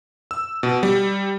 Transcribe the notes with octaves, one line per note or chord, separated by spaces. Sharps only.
E6
B2
G3